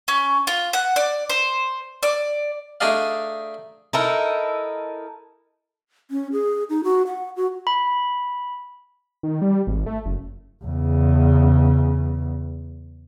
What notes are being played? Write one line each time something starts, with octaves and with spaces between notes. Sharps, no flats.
C#4
F4
F#5
D5
C5
D5
A3 D4 D#4 G#4 D5 F5
D#4 E4 A4 A#4
C#4
G#4
D#4
F#4
F#5
F#4
B5
D#3
G3
G#1
A3
F#1
E2 C#3